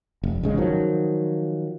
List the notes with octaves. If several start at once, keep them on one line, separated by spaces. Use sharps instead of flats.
F1
G#1 C#3 G#3
D#3 F3 F#3